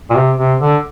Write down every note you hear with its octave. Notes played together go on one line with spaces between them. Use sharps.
A#2
C3
C3
D3